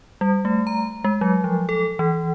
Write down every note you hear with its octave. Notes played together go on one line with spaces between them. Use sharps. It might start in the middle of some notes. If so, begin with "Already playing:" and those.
G3
A3
A#5
G#3
F#3
F3
A4
E3